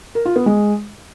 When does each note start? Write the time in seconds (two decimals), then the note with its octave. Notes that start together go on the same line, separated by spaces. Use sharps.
0.15 A#4
0.25 F4
0.36 B3
0.46 G#3